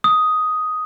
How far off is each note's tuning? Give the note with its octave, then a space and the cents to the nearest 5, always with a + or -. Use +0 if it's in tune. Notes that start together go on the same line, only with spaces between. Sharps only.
D#6 +5